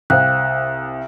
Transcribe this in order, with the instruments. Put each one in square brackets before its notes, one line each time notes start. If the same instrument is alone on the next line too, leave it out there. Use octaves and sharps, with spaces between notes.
[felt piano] C2 [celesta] C5 F5 G5 [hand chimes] F#6